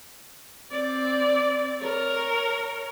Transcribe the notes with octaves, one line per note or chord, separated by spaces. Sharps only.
C4 D5
A#4 C#5